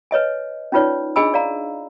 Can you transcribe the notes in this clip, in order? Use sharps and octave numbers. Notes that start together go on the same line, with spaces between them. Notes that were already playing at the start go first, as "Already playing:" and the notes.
B4 C#5 D#5 G#5
C#4 D#4 F4 B4 C#5 D5
D4 G#4 D#5 G#5 B5 E6
D5 F5 A#5